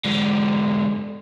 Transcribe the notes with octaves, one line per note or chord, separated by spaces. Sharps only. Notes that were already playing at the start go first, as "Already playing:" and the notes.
G#2 D3